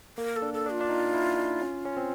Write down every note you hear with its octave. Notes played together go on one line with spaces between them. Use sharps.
A#3 A#4
A4
D4
A4
D4
F4
D4
D#4
E4
D4
C#4
C#4
C4